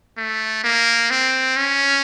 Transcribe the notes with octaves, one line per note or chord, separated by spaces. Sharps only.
A3
A#3
C4
C#4